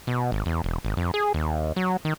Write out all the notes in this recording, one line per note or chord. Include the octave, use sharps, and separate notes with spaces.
B2
G#1
E2
E1
G#1
F2
G#4
D#2
F#3
D#3